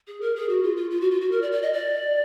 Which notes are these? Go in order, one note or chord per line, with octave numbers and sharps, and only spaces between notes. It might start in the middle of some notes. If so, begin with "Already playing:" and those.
G#4
A#4
G#4
F#4
F4
F4
F4
F#4
F4
F#4
A#4
D5
D5
D#5
D5